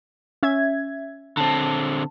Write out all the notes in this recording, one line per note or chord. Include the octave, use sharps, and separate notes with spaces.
C#4 E5 G#6
D3 C4 A5